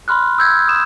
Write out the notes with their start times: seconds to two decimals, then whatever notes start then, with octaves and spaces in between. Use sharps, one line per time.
0.08 B5 C6 F6 F#6
0.39 E6 G6 G#6
0.68 D#6 E7